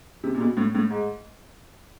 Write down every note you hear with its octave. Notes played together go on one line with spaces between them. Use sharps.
C3
A#2
B2
A2
A2
G#2